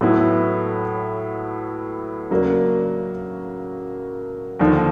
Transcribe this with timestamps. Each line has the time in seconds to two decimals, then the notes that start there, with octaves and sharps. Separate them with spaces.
0.01 A2 F#3 B3 E4
2.30 C#3 F#3 A#3 D4
4.59 D#2 D3 F3